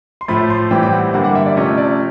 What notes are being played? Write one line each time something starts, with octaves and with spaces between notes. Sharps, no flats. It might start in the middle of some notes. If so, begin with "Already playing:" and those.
C6
A2 F3 A3 B5
C6
A2 E3 G3 C4 G5
G5
F#5
G2 D3 G3 A#3 F#5
F#5
E5
D5
C3 F3 A3 C#4 D#5
D5